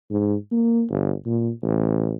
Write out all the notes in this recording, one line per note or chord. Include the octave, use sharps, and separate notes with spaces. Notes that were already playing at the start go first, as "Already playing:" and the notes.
G#2
A#3
G1
A#2
A1